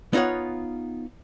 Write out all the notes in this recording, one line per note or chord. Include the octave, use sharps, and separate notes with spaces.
B3 D#4 F4 C#5 F#5